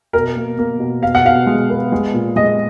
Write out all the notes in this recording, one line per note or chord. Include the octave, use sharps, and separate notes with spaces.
B2 A#4
A#3
A#3
B2
B2 F5
F#5
B2 F5
G#3
B3
G#3
A#2
G#3 D#5